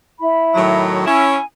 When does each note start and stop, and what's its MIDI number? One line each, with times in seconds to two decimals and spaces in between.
0.19 0.83 64
0.19 0.83 83
0.54 1.03 45
0.54 1.03 51
0.54 1.03 54
1.06 1.37 61
1.06 1.37 64
1.06 1.45 80